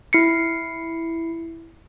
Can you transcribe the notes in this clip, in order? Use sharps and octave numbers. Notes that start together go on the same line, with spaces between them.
E4 C7 C#7